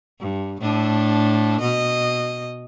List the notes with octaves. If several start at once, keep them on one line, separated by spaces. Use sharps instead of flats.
G2
A2 D4
B2 D#5